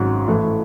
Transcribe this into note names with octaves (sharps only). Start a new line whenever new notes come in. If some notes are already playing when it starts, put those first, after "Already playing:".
Already playing: G#1 G#2 F#3 C#4 F#4
A2 E3 A3